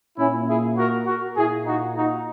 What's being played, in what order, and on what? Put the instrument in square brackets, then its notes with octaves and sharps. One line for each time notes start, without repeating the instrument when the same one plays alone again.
[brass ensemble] A#2 A#3 C#4 E4
E4 G#4
F#4 A#4
F#4 A#4
A#2 A#3 E4 G#4
D#4 F#4
D#4 F#4